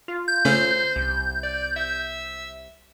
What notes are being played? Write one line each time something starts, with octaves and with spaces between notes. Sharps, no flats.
F4
G6
C#3 A3 C#4 C5
C2
D5
E5